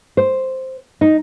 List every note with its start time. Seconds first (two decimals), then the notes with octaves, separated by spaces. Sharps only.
0.17 C5
1.01 D#4